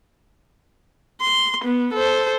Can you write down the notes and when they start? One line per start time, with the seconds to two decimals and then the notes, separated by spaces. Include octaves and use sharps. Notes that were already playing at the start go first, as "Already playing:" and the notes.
1.21 C6
1.64 B3
1.93 A4 C5